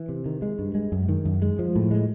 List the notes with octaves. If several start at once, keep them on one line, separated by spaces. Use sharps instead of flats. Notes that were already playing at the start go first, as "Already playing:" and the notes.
Already playing: E3
C3
D#3
G#3
G2
G#3
F#2
D#3
F#2
G#3
F3
A2
G#3